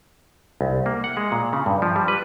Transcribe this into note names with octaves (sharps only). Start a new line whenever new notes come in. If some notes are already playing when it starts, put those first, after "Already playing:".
C2
A#3
F#5
G#3
A#2
C#3
G2
F3
G3
B4